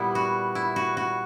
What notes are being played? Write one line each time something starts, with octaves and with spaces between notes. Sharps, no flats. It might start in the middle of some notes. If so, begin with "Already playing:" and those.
Already playing: A#2 G3 B3 E4
F#4
E4
F#4
F#4